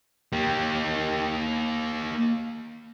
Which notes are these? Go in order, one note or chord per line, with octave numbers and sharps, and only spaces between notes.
A#3 G4